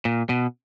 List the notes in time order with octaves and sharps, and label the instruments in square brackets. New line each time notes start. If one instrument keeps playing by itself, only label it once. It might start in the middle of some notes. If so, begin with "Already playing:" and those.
[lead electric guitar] A#2
B2